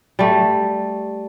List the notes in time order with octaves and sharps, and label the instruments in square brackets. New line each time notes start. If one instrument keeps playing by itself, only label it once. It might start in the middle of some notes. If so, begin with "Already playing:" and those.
[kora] G3 A3